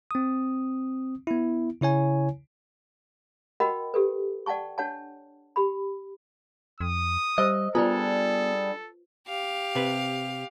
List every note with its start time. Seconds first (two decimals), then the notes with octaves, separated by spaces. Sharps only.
0.11 C4 D#6
1.27 B3 E4
1.81 C#3 E4 C#5 G#5
3.60 F#4 A#4 D#5 F#5 G5 B5
3.94 G4 A4 B4
4.46 D5 F#5 G5 A5 C#6
4.78 D4 C#5 F#5 A5
5.56 G4 B5
6.81 F2 D#6
7.38 G3 C5 D#5 E5 E6
7.75 G3 B3 D4 F4 G#4 A4 B4
9.28 G4 F5
9.75 C3 B4